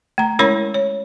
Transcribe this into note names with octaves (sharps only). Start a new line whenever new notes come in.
A3 A#5
G#3 C#4 E4 A#4 C#5 B5
C#5